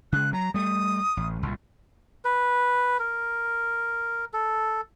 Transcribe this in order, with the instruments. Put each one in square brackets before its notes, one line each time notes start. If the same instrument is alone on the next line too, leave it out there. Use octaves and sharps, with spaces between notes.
[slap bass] C#3 G#3 [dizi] F#6
[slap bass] F#3 [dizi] A#5
[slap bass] G3 A3 [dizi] D#6
[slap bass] A1
C2 A#2
[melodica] B4
A#4
A4